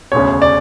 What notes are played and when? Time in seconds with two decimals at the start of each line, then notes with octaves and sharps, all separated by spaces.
0.12 E1 D2 C#3 C#5
0.42 D5